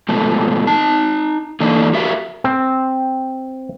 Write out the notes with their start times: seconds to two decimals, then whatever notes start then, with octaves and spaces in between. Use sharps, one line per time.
0.09 G#2 B2 F3 A3
0.67 D#4 A5
1.60 D3 E3 A3 A#3 D4 D#4
1.93 F#4 G4 A#4 E5 F5
2.44 C4